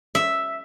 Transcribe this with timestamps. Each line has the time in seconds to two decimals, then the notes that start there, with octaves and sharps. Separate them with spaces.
0.15 E5